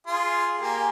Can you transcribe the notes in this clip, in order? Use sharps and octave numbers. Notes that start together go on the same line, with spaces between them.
F4 G#4 C6
A#3 G4 G#5